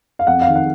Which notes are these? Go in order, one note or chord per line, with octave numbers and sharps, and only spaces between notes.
F5
F2 F#5
F5
D#3
F#5